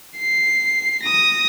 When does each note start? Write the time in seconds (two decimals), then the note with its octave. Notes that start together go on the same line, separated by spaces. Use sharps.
0.17 C7
1.03 D#6 A#6